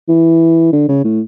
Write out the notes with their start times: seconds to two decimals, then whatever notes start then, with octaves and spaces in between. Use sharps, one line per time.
0.09 E3
0.73 D3
0.89 C#3
1.04 A2